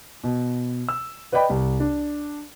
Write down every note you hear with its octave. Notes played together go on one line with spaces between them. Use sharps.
B2
E6
B4 D5 D#5 G5 B5
C2
D4